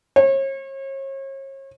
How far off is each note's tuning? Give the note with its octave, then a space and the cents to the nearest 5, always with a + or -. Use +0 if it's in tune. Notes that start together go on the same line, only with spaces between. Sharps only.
C#5 -40